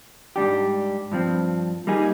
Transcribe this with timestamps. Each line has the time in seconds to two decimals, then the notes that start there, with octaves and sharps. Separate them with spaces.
0.36 G#2 G3 D4 G4
1.12 G2 F3 C4
1.87 G3 A#3 D#4 G#4